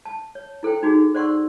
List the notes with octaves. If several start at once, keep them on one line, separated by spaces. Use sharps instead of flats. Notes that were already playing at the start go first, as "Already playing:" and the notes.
A5
C#5
E4 A4 C5 G5
D4 D#4 F#4 G#4
C5 D5 F#5 C6 C#6 E6